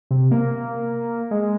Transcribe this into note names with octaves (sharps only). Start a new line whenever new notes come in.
C3
A#3
G#3